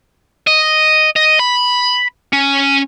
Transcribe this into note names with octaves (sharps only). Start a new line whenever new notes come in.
D#5
D#5
B5
C#4